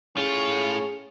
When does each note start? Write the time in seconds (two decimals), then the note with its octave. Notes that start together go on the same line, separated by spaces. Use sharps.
0.17 A2 C#4 F4 G#4 C#5